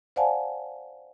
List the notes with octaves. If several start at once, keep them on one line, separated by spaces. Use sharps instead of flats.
C5 D5 F5 F#5 G#5 A5